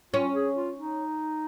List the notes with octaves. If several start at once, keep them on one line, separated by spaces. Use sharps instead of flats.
C#4 F4
G#4
F4
D#4